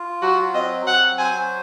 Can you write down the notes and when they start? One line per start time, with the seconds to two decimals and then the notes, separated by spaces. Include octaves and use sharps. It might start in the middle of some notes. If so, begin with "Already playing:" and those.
Already playing: F4
0.22 F#3 F#4
0.54 C4 D#5
0.86 F#3 F#5
1.18 C5 G#5